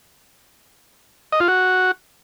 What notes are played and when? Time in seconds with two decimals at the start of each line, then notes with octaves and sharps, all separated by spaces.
1.32 D#5
1.40 F4
1.48 F#4